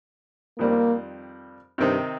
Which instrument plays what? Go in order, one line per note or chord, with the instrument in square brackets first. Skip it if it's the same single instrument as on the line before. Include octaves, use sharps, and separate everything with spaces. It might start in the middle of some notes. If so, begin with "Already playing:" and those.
[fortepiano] F2 D#3 G3 C4 [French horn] A#3
[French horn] G2 [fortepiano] C3 D#3 C4 D#4